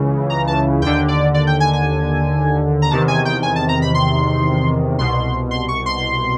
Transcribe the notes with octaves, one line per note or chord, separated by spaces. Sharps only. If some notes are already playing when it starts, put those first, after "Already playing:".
Already playing: C#2 C#3 E3
A#5
A5
D#2 D3 G5
D5
D5
G5
G#5
G#5
A#5
E2 C3 D#3 A5
G#5
G5
G#5
A5
A#5
B5
C6
C2 B2 C6
C6
C#6
C6